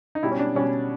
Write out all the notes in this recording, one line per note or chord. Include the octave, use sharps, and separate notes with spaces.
D#4
B2 G3 E4
C#4
D4
B2 G3 C#4